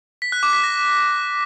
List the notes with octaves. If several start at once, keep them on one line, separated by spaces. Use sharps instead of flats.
B6
F#6
D6
B6
A#6